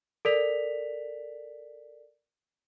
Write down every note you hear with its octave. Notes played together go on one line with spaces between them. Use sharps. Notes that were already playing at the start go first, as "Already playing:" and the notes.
A4 A#4 D5 B6 F7